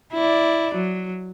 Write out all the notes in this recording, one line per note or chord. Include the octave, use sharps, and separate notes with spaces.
E4 D5
F#3